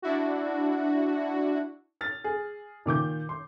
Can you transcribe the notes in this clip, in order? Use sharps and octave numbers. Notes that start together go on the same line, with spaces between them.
D4 E4 F#4
F6 A6
G#4
A#2 D#3 D6 G6
C6